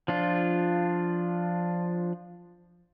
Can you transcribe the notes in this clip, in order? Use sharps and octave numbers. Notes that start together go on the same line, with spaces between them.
F3 D4 F4